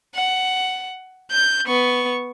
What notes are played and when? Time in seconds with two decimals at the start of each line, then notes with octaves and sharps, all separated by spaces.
0.15 F#5
1.31 G6
1.67 B3 C#6